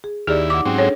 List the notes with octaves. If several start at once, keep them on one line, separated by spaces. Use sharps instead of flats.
G#4
D#2 E4 G4 G#4 D5
D#4 F#5 D6
G#2 F#3 C4 C#4 G5
D4 G#4 A4 C#5